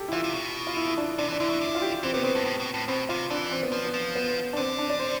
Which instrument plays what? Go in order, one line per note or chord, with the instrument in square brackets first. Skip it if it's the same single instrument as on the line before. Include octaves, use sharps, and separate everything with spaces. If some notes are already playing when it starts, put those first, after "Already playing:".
Already playing: [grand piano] G4 A4
E4
[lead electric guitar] E3 [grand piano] F4
[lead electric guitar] C3
B2
[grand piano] F4
E4
E4
D4
[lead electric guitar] C3 [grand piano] D4
[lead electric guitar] E3
[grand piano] D4
[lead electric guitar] D3 [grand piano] E4
[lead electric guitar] B2
D3
[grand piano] E4
F4
G4
[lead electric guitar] E3 [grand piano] C4
[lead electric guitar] C3 [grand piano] B3
[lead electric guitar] B2 [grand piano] C4
[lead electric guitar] G2
A2
B2
A2
[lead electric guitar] B2 [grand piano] C4
[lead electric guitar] C3 [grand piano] F4
[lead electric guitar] E3 [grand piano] D4
[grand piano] C4
B3
[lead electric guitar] F3
[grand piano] B3
[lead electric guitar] F3
[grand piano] B3
D4
[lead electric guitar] D3 [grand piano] C4
[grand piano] D4
D5
C5